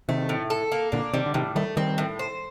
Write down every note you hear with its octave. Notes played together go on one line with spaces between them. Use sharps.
C3 D#3 A3
A2
A4
A#3
A#2 D3 D4
C3 D#3 G3
D3
A2 C3 D#3
D#3 G3 A3
D#3 G3 C4
A2
C5